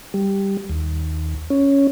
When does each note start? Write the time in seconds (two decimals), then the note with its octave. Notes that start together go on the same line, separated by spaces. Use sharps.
0.14 G3
0.69 D#2
1.50 C#4